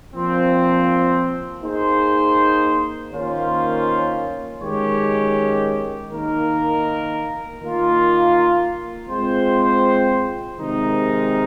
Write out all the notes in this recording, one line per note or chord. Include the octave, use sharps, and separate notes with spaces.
A#2 F3 C4
A#3 D#4 G#4 C5
D#3 A#3 C#4 F4 C5
D#3 G#3 C#4 G4 C#5
D#3 A#3 D#4 A#4
D#3 A#3 F4
G#3 C4 F4 C5
C3 D#3 G#3 D#4 A#4